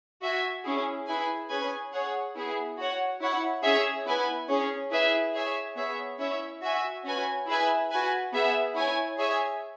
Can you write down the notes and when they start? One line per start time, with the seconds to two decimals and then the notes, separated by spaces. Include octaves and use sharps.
0.21 F#4 E5 G#5
0.64 C#4 E4 G#4
1.06 E4 G#4 B4 G#5
1.50 C#4 G#4 B4 G#5
1.93 G#4 C#5 F#5
2.35 B3 E4 G#4
2.77 F#4 C#5 F#5
3.20 E4 C#5 F#5
3.63 C#4 G#4 C#5 E5
4.06 B3 E4 B4 G#5
4.48 C#4 G#4 C#5
4.91 E4 G#4 B4 E5 G#5
5.33 G#4 C#5 E5 G#5
5.76 B3 G#4 C#5 E5
6.18 C#4 E4 C#5 E5
6.62 F#4 E5 G#5
7.04 C#4 F#4 B4 G#5
7.46 E4 G#4 B4 E5 G#5
7.90 F#4 B4 G#5
8.33 B3 G#4 E5
8.75 E4 C#5 G#5
9.17 G#4 C#5 E5 G#5